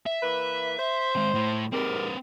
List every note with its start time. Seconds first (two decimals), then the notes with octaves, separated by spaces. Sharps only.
0.07 E5
0.23 E3 A#3 B4
0.79 C5
1.16 G#3 C4
1.35 A2
1.73 G#2 G3 C4 A#4 B4